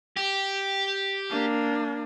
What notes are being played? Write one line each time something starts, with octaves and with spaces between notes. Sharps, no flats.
G4
A#3 D4